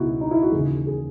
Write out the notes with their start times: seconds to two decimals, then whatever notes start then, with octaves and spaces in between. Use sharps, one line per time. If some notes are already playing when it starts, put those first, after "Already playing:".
Already playing: C#2 B2 D#4 E4 F#4
0.21 D#4
0.31 E4
0.42 F#4
0.52 D#2 C#3 E3 G#4
0.87 G#4